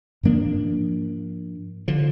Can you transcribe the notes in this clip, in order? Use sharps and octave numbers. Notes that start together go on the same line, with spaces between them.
G#2 F3 A#3 D4
D3 F3